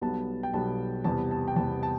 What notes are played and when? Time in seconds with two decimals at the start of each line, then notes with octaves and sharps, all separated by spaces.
0.01 B1 B2 G3 B3 A5
0.43 G5
0.53 B1 B2 G3 B3 A5
1.04 E2 C3 G3 B3 A5
1.31 A5
1.48 G5
1.56 E2 C3 G3 B3 A5
1.83 A5